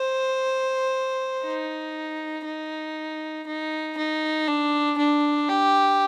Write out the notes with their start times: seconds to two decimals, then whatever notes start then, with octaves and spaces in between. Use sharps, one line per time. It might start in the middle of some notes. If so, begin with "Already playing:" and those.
Already playing: C5
1.44 D#4
2.45 D#4
3.47 D#4
3.97 D#4
4.48 D4
4.98 D4
5.49 G4